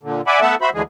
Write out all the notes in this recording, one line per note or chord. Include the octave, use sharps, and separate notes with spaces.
A#2 D3
D5 E5 F#5 G#5 B5 D6
A3 B3 A4 E5 F#5 A5
F#4 C5 E5 B5
D2 D3 E3 G#3 G#4